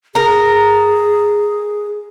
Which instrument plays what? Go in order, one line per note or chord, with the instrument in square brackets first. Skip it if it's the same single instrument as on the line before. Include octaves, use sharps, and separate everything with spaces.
[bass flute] G#4 [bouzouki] A#4 A#5